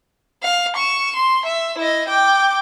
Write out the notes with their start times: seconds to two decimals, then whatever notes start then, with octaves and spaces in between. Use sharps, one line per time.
0.43 F5
0.76 C#6 E7
1.16 C6
1.45 E5
1.78 E4 D#5
2.08 G5 D6